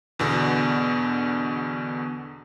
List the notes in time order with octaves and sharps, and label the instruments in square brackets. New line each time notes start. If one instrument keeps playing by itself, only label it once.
[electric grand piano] E2 B2 D3